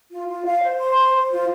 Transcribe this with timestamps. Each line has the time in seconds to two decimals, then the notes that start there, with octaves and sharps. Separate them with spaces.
0.11 F4
0.28 F4
0.45 F5
0.62 C5
0.79 C6
0.97 C5
1.14 C5
1.31 F4